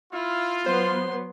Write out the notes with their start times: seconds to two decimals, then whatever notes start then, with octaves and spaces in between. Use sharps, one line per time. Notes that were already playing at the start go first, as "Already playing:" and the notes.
0.13 E4 F4
0.66 F#3 B3 C5 C6